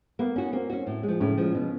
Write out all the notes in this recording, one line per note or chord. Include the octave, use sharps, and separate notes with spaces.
A#3 B3
C#4 F#4
A#3 C4
C#4 F#4
A2
G#3
F3
A2 C#3 C#4
F3 G#3
B2